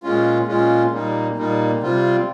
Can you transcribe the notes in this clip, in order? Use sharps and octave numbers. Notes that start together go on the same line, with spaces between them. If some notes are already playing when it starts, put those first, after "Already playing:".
A#2 G#3 C#4 F4
A#2 G#3 C#4 F4
A#2 G3 A#3 D#4
A#2 G3 A#3 D#4
C3 G3 C4 F4